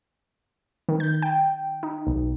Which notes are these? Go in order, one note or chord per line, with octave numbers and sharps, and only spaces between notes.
D#3
G6
G5
D#4
B1